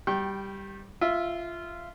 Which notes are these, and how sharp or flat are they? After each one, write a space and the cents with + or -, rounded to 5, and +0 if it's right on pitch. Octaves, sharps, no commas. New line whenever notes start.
G3 +0 G5 -20 C#6 -40
F4 -15 E5 +0